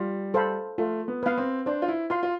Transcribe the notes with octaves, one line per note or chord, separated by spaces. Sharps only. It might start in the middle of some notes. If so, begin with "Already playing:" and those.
Already playing: G3 F4
A4 C5 F5 B5
A3 F4
B3
B3 B4 F5
C4
D4 C5
F4
E4
F4 F5 C6
F4